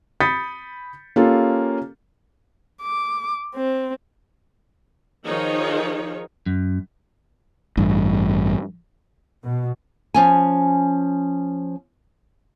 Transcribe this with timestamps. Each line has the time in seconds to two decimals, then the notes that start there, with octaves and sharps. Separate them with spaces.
0.20 B5 D#6 G6 A6 B6 C#7
1.16 A#3 C#4 F4 G4 A4
2.82 D6
3.55 C4
5.25 D#3 F3 D#4 G#4 C#5
6.46 F#2
7.77 A1 G2
9.44 B2
10.14 F3 C#4 G#5